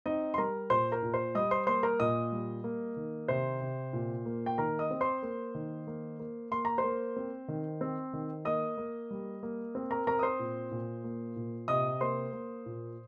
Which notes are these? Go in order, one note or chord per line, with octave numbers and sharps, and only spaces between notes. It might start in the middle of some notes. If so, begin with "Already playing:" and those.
C4 D#4 D#5
C6
G3 A#4 A#5
A#2 C5 C6
A#4 A#5
A#2
C5 C6
G3 D#5 D#6
C5 C6
A#3 C5 C6
A#4 A#5
A#2 D#5 D#6
G3
A#3
D#3
C3 C5 C6
C3
A#2
A#3
G5
D#3 A#4 A#5
D#5 D#6
C4
C5 C6
A#3
D#3
A#3
A#3
A#3 C6
A#5
C5 C6
A#3
C4
D#3
C4
D#3
A#3 D#5 D#6
A#3
G3
A#3
C4
A#4 A#5
C4 A#4 A#5
D#6
C5 C6
A#2
A#2
A#3
A#2
C3 D#5 D#6
A#3 C5 C6
A#3
A#2